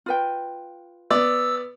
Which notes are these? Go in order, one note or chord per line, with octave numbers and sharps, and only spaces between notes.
F4 B4 G5
B3 D5 E6